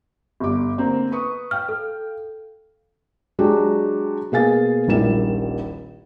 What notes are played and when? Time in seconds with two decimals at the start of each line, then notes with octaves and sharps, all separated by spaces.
0.40 G1 G2 D6
0.78 D3 A#3 C4
1.12 B4 C#6 D#6
1.51 F5 G5 F6
1.69 A4
3.39 F#3 G#3 D4 F#4 G4
4.32 B2 A#3 G#4 F5 G#5 A6
4.87 D#1 A#1 D#3 G3 E4 E7